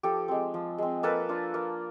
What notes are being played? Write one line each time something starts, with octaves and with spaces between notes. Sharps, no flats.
F3 G4 A4
G#3 C4
F3
G#3 C4
A#3 A4 B4
D4 F4
A#3